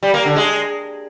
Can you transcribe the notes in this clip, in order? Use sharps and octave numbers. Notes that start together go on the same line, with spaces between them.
G3
A#3
D3
G#3